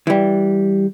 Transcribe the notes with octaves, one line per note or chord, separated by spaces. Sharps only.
E3 G3